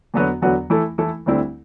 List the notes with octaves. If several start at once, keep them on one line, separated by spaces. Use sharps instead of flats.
E2 D3 F#3 B3 F#4
E2 D3 F#3 B3 F#4
E3 A3 E4 A4
E3 A3 E4 A4
D2 D3 G3 C4 E4